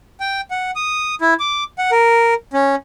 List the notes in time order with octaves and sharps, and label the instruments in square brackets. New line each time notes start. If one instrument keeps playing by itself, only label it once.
[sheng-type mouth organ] G5
F#5
D#6
E4
D6
F#5
A#4
C#4